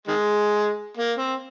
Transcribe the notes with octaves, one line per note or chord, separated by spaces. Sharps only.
D#3 G#3
A#3
C4